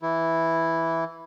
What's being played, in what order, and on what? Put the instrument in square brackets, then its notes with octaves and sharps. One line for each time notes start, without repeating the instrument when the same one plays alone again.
[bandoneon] E3 E4